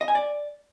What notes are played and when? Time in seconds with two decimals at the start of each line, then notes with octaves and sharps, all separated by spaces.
0.01 D#5
0.08 G#5
0.15 D5